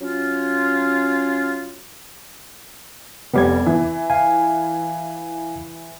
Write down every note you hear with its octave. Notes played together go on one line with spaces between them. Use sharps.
F#3 C#4 F4
F1 G3 B3 D6 G#6
E3
F5 G#5